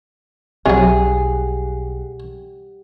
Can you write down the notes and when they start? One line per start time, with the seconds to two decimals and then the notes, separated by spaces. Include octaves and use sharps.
0.66 B1 C3 F#3 G4 G#4 F#5